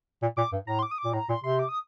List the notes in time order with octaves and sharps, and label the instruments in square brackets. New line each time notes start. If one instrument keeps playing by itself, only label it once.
[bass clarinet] A#2
[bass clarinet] A#2 [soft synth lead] D6
[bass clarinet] G2
[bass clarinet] A2 [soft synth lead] A#5
[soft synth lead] C6
D6
D#6
D6
[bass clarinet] A#2
[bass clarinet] A2 [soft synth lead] A#5
[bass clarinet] A#2 [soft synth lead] C6
[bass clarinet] C3 [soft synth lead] C6
[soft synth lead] D6
D#6